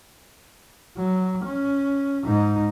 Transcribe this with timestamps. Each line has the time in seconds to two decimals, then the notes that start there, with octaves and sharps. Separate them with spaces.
0.97 F#3
1.45 C#4
2.25 G#2 D#4